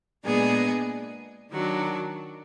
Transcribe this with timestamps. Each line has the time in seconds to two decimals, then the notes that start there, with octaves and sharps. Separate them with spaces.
0.24 A#2 G#3 B3 D4 G#4
1.50 D#3 F#3 D4